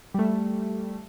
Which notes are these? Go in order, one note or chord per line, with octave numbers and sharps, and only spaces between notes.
G3 A3